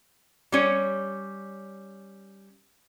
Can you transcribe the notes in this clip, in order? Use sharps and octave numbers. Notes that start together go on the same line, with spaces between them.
G3 C#4 C#5